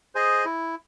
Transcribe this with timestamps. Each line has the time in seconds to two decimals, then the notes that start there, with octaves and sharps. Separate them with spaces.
0.15 G#4 C5 D#5 G#5
0.45 E4